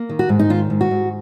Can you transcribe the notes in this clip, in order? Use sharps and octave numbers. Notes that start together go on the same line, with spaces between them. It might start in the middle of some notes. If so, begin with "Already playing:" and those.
Already playing: A#3
D#3
F#4
G#2
D#4
D#3 F4
G#2
F#4
G#2